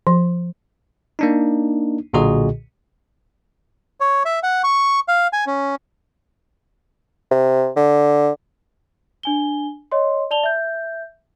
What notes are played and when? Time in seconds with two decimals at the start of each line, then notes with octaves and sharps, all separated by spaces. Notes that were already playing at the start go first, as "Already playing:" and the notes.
0.07 F3
1.19 A#3 D4 D#4
2.13 B1 A#2 D3 F#4 G#4 D#5
4.00 C#5
4.25 E5
4.43 F#5
4.64 C#6
5.08 F5
5.33 G#5
5.47 C#4
7.31 C3
7.76 D3
9.23 D4 G#5 G7
9.92 C#5 D#5 C6
10.31 D5 A5 F7 G7
10.43 E5 G6